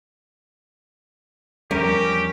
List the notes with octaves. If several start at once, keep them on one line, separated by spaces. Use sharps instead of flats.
E2 F3 G3 C#4 G4 A#4